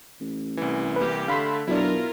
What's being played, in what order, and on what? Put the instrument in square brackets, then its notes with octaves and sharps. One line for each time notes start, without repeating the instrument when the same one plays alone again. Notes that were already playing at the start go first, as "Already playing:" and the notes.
[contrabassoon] A1
[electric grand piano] C2 E3
[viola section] A#3 G4 [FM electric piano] B4
[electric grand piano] D3 B6 [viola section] A3 [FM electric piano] F5 B5 C6
[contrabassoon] B2 [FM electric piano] F#3 D4 [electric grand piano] E4 [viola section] F4 A#4